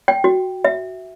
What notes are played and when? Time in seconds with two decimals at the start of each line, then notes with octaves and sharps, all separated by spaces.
0.08 G5
0.24 F#4
0.65 E5